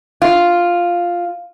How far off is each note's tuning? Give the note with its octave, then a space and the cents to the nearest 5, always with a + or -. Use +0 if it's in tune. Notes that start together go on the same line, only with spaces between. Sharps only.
F4 +0